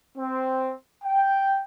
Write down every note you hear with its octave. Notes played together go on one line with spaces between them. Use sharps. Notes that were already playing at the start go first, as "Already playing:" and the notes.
C4
G5